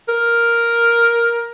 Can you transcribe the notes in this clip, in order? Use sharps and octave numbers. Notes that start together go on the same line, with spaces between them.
A#4